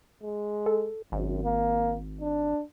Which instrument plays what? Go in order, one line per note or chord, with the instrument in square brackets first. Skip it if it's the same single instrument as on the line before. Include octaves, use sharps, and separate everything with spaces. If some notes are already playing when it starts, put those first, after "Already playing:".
[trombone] G#3
[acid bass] A4
[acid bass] G#1 [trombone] F#2
[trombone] A#3
D4